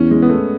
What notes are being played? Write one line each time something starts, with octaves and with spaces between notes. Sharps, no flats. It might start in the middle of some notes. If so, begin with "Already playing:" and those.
Already playing: E2 C#4
G#3
B3
A3